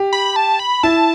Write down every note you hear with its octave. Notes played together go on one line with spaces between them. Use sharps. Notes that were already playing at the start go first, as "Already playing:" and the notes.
Already playing: G4
B5
A5
B5
E4 A5